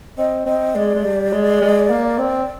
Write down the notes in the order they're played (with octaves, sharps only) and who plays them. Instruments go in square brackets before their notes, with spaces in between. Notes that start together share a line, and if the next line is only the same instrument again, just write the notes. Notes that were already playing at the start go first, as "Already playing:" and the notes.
[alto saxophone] C4 [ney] D#5
[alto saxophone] C4 [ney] D#5
[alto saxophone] G#3 [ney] D5
[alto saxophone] G#3
G3
G#3
G#3
A#3
C4